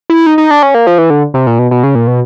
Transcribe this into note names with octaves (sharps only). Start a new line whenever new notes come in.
E4
D#4
D#4
D4
C#4
A#3
F3
E3
D3
C3
A#2
B2
B2
C#3
A#2
B2